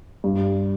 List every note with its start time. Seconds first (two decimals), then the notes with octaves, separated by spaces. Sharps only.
0.24 G2